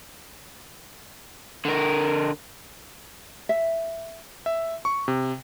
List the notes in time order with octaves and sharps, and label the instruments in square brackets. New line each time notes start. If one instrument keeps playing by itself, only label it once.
[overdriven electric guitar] D3 A#4
[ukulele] E5
[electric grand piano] E5
C#6
C3